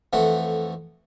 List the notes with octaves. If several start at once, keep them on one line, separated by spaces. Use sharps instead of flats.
F2 E3 A3 F#5